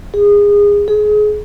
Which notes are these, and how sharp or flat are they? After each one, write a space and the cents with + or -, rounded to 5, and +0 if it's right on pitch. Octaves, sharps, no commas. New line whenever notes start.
G#4 -25
G#4 +25